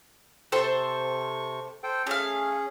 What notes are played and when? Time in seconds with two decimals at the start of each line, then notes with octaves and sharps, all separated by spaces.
0.52 C3 A4 C5 G5 C#6
1.83 A4 C5 G5
2.07 A3 C#4 G#4 F5